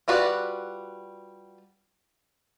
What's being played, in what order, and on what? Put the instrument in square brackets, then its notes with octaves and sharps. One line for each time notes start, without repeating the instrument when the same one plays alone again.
[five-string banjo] G3 F4 F#4 B4 D5